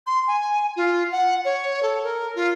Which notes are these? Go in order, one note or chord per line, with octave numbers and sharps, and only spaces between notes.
C6
G#5
F4
F#5
C#5
A4
A#4
F4